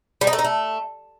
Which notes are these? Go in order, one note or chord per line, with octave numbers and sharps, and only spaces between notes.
G3
D#4
A3
D#4
A3